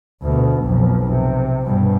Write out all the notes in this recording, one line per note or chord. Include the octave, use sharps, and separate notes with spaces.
D2 B2
B1 F2
C3
G2 B2